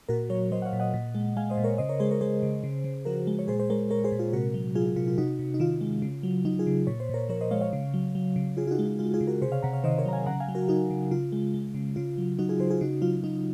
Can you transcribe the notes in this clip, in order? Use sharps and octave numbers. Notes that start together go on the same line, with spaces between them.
A#2 F#4 A#4
F#3 A#4 C#5
F#3 C5 D#5
F#5
C#5 F5
A#2
D#5 F#5
A#2
G#3
G#3 F5 G#5
C5 D#5
A#2
A#4 C#5
C#3 C5 D#5
A#4 C#5
G#3 G#4 C5
A#4 C#5
G#3 G#4 C5
C#3
C#3
C#3
F3 F#4 A#4
G#3
C#5
A#2 G#4 C5
C5
G#3 A#4 C#5
G#3 A#4 C#5
G#4 C5
A#2
F4 G#4
C3 F#4 A#4
F#3
F#3 F4 G#4
F4
C3 F4
F4
C3 D#4 F#4
C3
D#4
D#3 F4
G#3
C#3
F#3
F#3 D#4
F4 G#4
C#3
A#2 C#5
C5
A#2 A#4 C#5
F3 A#4 C#5
C5 D#5
G#3 C#5 F5
C#5 F5
C#3
F#3
F#3
C#3
C#3 F4 G#4
F4
D#4 F#4
G#3
F4
G#3 F4
F4 G#4
C#3
F#4 A#4
C3 G#4 C5
C#5 F5
C3 F#5 A#5
C#5 F5
D#3 C5 D#5
A#4 C#5
F#3 A#5
F5 G#5
C#3 F#5 A#5
F5 G#5
F#3
F#4 A#4
F#3 D#4 F#4
C#3
C#3 F4
G#3
G#3
C#3
C#3 F4
F#3
F#3 D#4 F#4
F4 G#4
C#3 G#4 C5
F4 G#4
C#3 D#4 F#4
F#3 F4
F#3 D#4